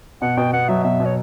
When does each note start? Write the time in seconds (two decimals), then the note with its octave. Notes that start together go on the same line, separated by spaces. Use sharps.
0.22 B2 F#5
0.37 B2 G5
0.52 B3 F#5
0.69 F#3 E5
0.84 B2 E5
1.00 B2
1.06 C#5